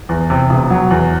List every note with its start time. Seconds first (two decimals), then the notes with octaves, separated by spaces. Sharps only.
0.09 E2
0.30 C3
0.50 E1
0.70 F#3
0.90 E2